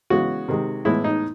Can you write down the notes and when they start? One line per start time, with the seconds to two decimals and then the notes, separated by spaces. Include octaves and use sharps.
0.10 C#3 E3 G#3 B3 F#4
0.48 C3 D#3 G#3
0.85 A2 E3 G#3 B3 E4
1.04 D#4